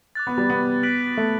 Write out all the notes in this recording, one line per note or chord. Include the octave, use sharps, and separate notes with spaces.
D6 F#6 A6
B3
G3
B3
F#6 B6 D7 F#7
A3